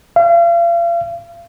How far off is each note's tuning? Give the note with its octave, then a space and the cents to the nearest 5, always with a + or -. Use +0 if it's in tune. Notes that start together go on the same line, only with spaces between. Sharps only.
F5 -40